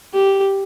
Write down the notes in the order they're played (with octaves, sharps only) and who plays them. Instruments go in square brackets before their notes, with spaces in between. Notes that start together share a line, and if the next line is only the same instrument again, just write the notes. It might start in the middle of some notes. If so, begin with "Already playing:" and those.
[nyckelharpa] G4